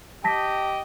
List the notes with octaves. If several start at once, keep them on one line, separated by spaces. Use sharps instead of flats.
G4 D#5 G5 A5 A#6 B6